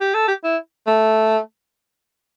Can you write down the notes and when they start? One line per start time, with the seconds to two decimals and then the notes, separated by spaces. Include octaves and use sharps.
0.01 G4
0.14 A4
0.28 G4
0.44 E4
0.87 A3